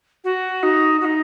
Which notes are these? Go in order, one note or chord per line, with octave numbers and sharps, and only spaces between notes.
F#4
D#4
F#4
D#4